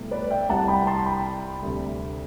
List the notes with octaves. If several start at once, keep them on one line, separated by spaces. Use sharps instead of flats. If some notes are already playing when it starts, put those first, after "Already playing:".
Already playing: C2 B2 A3
B4 D5
E5 G5
C2 C3 G3 F#5 A5
G5 B5
A5 C6
G5 B5
D2 C3 G3